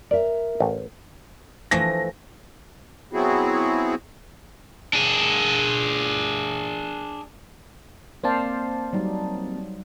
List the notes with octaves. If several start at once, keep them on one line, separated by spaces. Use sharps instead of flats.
A#4 D5 E5
A1
E3 F3 A3 A#6
F#3 B3 C4 E4 F#4 G#4
D4 G#4
A#3 C4 C5 D5 F5 A5
F#3 G3 D#4